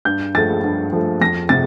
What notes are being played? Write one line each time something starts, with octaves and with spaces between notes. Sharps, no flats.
G2 G6
F3 A3 A6
G2
F3 A3
F2 A#6
C3 A6